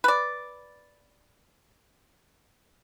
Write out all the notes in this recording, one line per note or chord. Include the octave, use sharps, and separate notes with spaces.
B4 D5